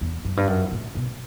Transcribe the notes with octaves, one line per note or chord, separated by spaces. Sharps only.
E2
F#2
G2
F#2
A2
B2